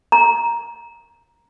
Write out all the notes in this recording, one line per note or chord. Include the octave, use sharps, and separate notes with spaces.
A#5